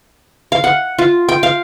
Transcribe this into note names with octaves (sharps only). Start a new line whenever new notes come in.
F5
F#5
F4
G5
F5